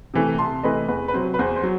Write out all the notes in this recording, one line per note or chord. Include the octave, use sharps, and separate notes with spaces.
C3 E3 A3
C2 A5 C6
C3 E3 A3 B4 D#5
E2 B4
B4
C3 F#3 C5
B4
E2 C5
C5
F#3